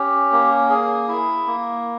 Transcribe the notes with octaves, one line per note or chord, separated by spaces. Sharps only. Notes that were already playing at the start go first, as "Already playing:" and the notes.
Already playing: C#4 G4
A#3
G#4
E4
A#3